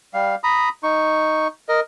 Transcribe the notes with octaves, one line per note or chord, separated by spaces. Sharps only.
G3 F5
A#5 B5 D#6
D#4 C#6
A#4 D#5